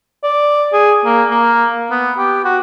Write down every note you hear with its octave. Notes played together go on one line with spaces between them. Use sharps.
D5
G#4
A#3
A#3
B3
G4
F#4